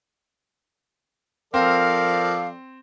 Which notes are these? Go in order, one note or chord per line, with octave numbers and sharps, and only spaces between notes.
F3 C4 A4 A#4 D5 F5